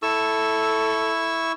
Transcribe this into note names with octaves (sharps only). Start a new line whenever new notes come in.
E4 A4 C#6 E6